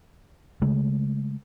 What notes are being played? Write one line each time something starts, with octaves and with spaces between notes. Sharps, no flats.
C#3 G#3 A3